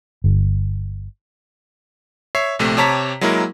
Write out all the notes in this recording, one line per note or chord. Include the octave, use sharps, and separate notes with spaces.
G1
C#5 E5 C7
A#1 C3 A3
C3 G4 C#5 A5 A#5 B6
F#3 G#3 A#3 E4 A#4